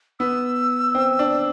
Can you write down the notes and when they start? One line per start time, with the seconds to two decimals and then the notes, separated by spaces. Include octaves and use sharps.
0.20 B3 E6
0.95 C4
1.19 D4